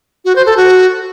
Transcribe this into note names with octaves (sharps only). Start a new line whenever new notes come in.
F#4
C5
A4
F#4